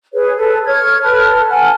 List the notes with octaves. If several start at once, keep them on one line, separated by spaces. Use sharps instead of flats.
G#4 B4 C#5
A4 B4
C#5 F6 G#6
A4 B4 A5 F6
F#5 G#5 A5 F6